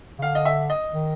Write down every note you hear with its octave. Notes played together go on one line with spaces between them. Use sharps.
C#3
D3 F5
D#5
E5
D#5
D#3